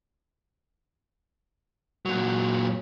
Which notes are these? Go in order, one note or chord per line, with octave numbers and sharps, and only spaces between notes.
A#2 F#3